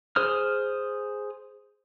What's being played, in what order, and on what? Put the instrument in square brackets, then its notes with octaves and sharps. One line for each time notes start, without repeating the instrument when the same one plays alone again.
[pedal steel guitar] G#4 C5 D#6 F6